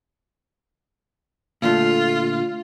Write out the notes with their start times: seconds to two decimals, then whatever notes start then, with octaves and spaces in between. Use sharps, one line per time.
1.62 A#2 D3 A3 F4